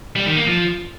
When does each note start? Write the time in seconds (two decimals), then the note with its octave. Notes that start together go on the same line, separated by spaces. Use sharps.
0.16 G3
0.26 D#3
0.37 A#3
0.47 F3